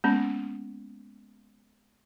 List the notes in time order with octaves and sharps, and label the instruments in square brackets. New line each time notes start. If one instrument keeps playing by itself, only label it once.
[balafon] G#3 A#3 B3 C#4